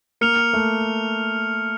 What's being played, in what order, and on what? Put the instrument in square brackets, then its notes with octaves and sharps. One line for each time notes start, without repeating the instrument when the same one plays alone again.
[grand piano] A#3 [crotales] F6 C#7 F7
[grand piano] A3